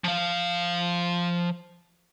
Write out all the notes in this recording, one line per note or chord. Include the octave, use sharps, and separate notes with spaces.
F3 F5